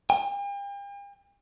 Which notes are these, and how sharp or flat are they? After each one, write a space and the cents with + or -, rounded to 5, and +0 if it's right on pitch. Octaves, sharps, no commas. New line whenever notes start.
G5 +45